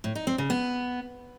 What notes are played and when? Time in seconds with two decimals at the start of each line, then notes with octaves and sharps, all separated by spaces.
0.04 A2
0.15 D#4
0.27 C4
0.38 C#3
0.50 B3